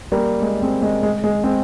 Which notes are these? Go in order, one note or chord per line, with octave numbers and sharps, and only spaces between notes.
G3 A#3
G#3
G#3 C4
G#3
G#3
G#3
G#3 C4